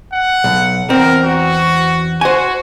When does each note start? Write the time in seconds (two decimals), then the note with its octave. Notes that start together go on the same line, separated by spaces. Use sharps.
0.13 F#5
0.44 B1
0.90 E2 C4 A#4
1.24 F#4
2.21 F#4 C5 G#5